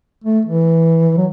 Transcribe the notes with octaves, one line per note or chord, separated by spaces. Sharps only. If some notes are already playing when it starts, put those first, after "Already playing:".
A3
E3
F#3